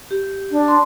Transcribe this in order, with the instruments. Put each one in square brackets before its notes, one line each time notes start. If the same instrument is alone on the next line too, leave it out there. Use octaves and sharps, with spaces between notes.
[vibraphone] G4
[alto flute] D4
[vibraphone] C6